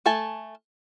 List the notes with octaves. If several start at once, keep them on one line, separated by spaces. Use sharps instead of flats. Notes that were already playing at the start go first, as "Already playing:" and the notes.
A3 A4 G#5 A5